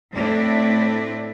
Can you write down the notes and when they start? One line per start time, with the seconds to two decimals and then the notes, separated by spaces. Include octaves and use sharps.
0.14 A2 A3 C4 D4 E4